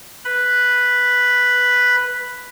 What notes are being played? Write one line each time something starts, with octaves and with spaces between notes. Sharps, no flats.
B4 B5